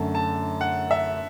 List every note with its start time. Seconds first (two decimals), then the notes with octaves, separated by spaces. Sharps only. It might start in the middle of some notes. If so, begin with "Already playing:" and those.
Already playing: F#2 D3 A3 A5
0.15 A5
0.61 F#5
0.91 E5